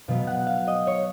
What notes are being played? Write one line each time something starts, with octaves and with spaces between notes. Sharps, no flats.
B2 F#3 B3 F5
F#5
F5
D#5
C#5